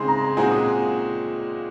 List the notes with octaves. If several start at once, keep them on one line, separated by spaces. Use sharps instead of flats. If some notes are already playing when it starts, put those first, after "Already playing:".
Already playing: C#3 G#3 C4 D#4 G#4 C6
A#5
A#2 G#3 C4 D#4 F#4 G#5
D#6